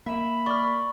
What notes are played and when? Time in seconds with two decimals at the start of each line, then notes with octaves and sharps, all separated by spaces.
0.06 A#3 E5 B5 E7
0.46 D5 C#6 D6 F6